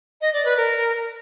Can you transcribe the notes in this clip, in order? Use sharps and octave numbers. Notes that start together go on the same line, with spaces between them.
D#5
D5
B4
A#4